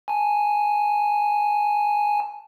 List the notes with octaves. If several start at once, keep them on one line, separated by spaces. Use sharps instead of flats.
G#5 A5